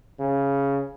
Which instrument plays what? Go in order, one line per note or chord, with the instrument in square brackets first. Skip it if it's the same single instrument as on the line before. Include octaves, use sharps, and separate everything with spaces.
[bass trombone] C#3